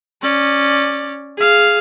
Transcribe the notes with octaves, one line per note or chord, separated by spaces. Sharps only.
C#4 D5
G#4 F5